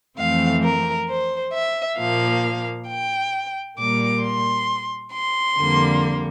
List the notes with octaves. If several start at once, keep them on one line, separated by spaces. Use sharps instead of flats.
F2 E3 A3 C4 F5
A#4
C5
E5
A#2 F3 A#3 F5
G5
A#2 G3 A#3 D6
C6
C6
F2 D3 G3 A#3